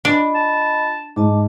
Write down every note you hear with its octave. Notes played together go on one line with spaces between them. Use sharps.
D4 F4 D#5 B5
A5
G#2 D#5 A5 D6